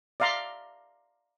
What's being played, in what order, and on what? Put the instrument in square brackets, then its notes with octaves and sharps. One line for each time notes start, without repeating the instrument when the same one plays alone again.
[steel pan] D5 E5 F5 A#5 C6